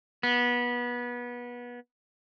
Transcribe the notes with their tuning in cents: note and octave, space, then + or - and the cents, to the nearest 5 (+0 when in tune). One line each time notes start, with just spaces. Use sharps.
B3 -25